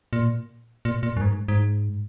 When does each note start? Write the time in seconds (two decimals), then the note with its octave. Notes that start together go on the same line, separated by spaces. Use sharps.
0.13 A#2
0.85 A#2
1.03 A#2
1.17 F#2
1.21 G#2
1.48 G#2